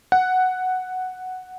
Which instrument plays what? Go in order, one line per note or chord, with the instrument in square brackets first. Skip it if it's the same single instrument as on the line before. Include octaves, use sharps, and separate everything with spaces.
[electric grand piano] F#5